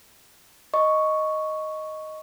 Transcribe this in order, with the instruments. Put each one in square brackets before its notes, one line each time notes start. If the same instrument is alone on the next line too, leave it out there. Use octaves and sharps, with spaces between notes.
[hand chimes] D#5 C#6